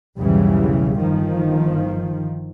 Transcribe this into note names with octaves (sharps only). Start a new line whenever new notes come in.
B1 E2 G#2 C#3 E3 G3
G1 D#3 F3